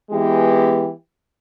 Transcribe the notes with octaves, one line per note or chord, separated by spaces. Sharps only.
E3 G#3 B3 G4